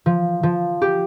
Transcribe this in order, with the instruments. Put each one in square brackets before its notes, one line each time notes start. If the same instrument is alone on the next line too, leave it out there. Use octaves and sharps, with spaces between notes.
[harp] F3
F3
G4